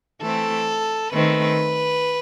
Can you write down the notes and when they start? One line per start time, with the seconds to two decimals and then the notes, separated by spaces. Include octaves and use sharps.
0.21 E3 A3 C4 A4
1.12 D#3 A3 C4 B4